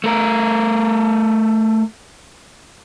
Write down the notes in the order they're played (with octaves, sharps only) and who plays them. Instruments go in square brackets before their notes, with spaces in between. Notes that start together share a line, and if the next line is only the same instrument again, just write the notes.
[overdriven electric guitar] A3 A#4